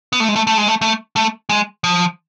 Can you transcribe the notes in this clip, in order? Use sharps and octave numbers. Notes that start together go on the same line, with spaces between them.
B3
A3
G#3
A3
A3
G#3
A3
A3
A3
G#3
F3